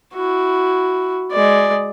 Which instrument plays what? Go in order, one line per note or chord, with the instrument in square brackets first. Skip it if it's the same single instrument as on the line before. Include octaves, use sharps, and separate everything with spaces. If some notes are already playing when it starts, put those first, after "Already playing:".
[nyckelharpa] E4 F#4
G#3 D5